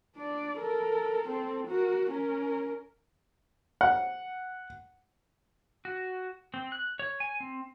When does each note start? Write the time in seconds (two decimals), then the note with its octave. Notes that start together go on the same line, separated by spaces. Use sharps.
0.17 D4 D5
0.58 A4 A#4
1.28 C4 A4
1.68 F#4 A#4
2.10 C#4 A#4
3.81 F#5
5.85 F#4
6.54 C4
6.72 F#6
6.99 C#5
7.20 G#5
7.40 C4